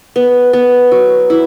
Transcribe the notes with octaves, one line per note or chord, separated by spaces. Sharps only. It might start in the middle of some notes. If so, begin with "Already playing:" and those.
B3
B3
F#3
E4